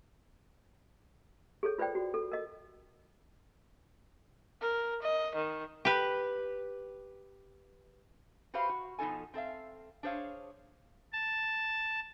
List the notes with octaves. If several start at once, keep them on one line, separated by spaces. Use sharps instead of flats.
G#4 A4 C#5
F4 B4 C5 D5 G5
F#4
A4
A#4 D#5
A#4
D#5
D#3
G4 B4
F#4 G4 B4 C5 F5
F#4
B2 F3 D#4 A4 G#5
C4 A4 E5 F5
D4 G#4 C5 C#5 F5
A5